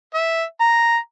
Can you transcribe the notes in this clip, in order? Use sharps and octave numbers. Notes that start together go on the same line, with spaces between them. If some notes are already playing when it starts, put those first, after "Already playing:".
E5
A#5